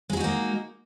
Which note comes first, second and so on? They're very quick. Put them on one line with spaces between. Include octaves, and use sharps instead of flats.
G#3 G#4 F#4 D#4 A#3